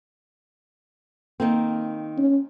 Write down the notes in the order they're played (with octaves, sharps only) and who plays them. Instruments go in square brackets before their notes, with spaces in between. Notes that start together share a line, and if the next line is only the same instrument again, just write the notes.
[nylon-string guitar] D#3 A#3 C4
[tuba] C#4